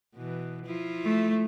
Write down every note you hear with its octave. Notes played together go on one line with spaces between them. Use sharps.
B2 E3
F3 E4 F4
A3